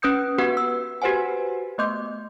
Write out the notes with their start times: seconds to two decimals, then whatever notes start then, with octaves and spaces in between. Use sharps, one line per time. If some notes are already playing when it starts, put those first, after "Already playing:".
0.02 C#4 B4 D#6 G6 C#7
0.38 B3 F#4 G4 B4 F#5
0.57 E6
1.02 F#4 G4 B4 C5 F#5 G#5
1.78 A3 B3 D#5 C6 D6 G6